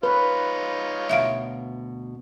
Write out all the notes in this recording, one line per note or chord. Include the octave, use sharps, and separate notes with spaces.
D#4 F4 B4 C#5
D2 B2 E5 F5